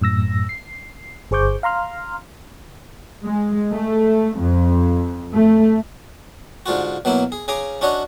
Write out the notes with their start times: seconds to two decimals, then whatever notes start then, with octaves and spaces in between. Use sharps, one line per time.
0.01 F#2 A2 E6 A#6
0.49 C7
1.31 G1 G#4 C5 C#6 D6 G6
1.63 F5 A#5 C6 F6
3.25 G#3
3.72 A3
4.39 F2
5.33 A3
6.66 G#2 D3 F4 F#4
7.05 B2 F#3 A#3 E4
7.32 G#4
7.48 C#3 G#4 G#5 A#5 D6
7.81 C#4 D4 F#4 C#5 D#5